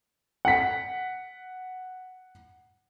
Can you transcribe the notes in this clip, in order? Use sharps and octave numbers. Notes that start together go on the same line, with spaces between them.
F#5 B6